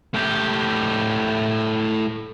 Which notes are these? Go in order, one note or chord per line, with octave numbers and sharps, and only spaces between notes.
A2 G4